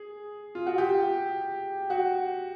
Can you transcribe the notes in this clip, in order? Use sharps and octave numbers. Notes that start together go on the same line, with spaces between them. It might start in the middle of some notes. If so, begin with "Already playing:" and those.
Already playing: G#4
F4
F#4
G4
F#4